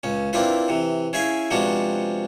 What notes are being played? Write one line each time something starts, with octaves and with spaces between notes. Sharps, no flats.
C#2 C#4
A#3 C4 D4 E4 F4 B4
C3 E3
C#4 E4 G#4 E5 F5 G#5
C3 F3 G#3 B3 D4 F#4